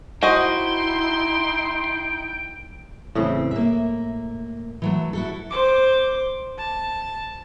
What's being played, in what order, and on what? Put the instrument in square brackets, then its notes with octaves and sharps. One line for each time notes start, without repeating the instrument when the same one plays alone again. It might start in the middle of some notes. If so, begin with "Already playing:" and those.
[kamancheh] D#4 E4 [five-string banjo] F#4 C5 D#5 [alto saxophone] G5 [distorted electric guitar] C6
[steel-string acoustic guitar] E2 C#3 C4 [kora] A2
[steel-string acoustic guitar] A#3 E5
E3 F#3 A3
E4 F#4 A4
[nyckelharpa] C5 D6
A5